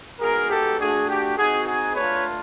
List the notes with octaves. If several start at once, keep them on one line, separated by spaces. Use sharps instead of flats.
G#3 B3 D#4 F#4 G#4 A#4
G4 A4
A3 D4 F#4 G#4
G4
C4 D#4 F#4 G#4
G#4
A3 D4 F4 B4 C#5